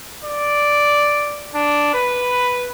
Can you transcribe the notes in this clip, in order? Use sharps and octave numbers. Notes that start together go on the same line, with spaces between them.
D5
D4
B4